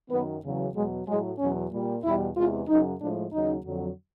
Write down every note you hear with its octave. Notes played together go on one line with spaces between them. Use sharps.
F#2 D#3 F#3 B3
E2 C#3 F#3
E2 B2 F#3 G#3
A2 F#3 G#3
E2 B2 F#3 C#4
A#2 G3
E2 B2 G3 E4
E2 C3 E3 G#3 F4
F#2 C#3 F#3 D#4
A2 F3 G#3 D4
D#2 C#3 F#3 D#4
F2 D3 F#3